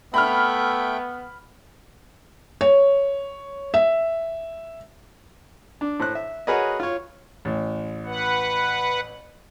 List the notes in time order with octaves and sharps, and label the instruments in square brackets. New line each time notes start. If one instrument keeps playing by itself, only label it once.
[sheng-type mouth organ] A3 E5 G5 [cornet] B3 [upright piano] B5 F6
[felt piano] C#5
E5
[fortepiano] D4
A2 C5 F#6
E5
F#4 G#4 A#4 B4 C#5 D#5
F4 C#5
[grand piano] A1
[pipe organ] B4 F#5